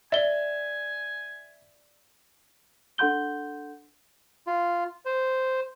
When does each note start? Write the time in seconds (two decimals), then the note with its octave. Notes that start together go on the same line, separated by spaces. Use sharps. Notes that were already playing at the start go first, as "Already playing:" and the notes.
0.12 D5 E5 G#5 G7
2.98 D4 A4 F#5 C6 G6 G7
4.47 F4
5.05 C5